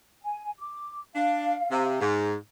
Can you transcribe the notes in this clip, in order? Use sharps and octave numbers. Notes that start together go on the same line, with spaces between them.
G#5
D6
D4 F5
C3
G#2